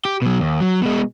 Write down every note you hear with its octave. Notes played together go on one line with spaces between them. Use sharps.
G4
B2 F#3
D#2
F#3
B2 G#3